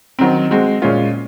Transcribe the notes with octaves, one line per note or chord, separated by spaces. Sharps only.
D#3 F#3 C4
G#3 C4 F#4
A#2 G#3 C#4 F4